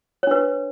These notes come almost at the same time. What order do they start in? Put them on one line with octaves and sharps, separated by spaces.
C#5 D4 B4